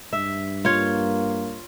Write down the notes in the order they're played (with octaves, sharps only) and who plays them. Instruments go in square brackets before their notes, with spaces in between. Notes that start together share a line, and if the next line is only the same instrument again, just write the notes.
[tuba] G2 [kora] E5
[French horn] A#3 [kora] F4 C#5